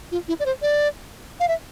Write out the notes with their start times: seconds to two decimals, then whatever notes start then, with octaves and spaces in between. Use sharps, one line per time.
0.12 F4
0.28 E4
0.40 D5
0.46 C5
0.62 D5
1.40 F5
1.48 E5